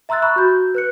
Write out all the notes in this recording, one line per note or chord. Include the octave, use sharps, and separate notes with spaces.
E5 A#5 C6 E6 F#6 A6
B5 C#6 F#6
F#4 G6
B4 F#6 C#7